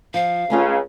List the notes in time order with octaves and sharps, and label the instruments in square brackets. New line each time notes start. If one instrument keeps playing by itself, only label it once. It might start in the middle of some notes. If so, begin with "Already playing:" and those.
[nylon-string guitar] F3 [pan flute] F5
[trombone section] C#2 C#3 [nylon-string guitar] A3 C#4 F4